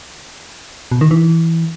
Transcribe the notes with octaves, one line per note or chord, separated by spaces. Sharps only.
B2
D#3
E3